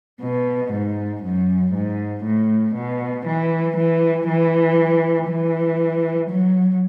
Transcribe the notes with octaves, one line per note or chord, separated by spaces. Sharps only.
B2
G#2
F#2
G#2
A2
B2
E3
E3
E3
E3
F#3